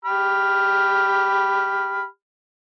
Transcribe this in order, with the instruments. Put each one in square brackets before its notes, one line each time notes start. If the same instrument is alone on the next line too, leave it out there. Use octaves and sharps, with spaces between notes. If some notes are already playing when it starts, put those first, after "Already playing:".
[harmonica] G4 B5 F6